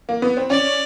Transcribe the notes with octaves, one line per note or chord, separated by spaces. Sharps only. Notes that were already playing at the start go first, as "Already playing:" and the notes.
A#3
B3
C4
C#4 D5